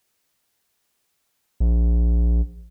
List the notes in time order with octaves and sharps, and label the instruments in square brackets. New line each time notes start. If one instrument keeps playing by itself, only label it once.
[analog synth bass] A#1